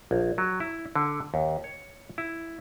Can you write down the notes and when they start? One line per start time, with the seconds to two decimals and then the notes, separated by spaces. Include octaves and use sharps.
0.11 A#1
0.38 F#3
0.60 E4
0.96 D3
1.34 D#2
1.64 C#5
2.18 E4